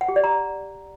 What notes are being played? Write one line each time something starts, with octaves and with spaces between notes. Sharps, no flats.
F#5
G4
D5
A#5